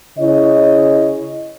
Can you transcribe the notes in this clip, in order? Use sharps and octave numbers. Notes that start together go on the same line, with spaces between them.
C#3 E4 C#5 D#5